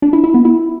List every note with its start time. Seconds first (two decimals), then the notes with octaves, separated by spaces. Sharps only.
0.02 D4
0.13 E4
0.24 E4
0.34 B3
0.45 E4